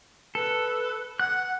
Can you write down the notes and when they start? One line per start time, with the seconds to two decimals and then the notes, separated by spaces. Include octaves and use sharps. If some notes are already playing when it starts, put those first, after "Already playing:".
0.35 A4 B4
1.19 F#5 F#6